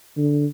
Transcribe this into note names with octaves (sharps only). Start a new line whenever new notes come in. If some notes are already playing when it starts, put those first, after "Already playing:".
D3